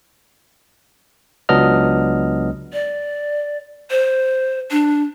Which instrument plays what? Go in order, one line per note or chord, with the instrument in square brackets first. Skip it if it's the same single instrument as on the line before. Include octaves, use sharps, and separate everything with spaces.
[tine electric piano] C#2 F#3 B3 D4 D#5 F6
[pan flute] D5
C5
D4